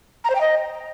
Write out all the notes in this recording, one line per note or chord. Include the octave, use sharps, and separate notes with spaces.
A#5
C5
G5
D#5